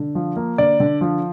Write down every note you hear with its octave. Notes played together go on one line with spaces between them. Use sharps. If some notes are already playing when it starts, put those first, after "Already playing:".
Already playing: D3
F3
A#3
D3 D5
D3
F3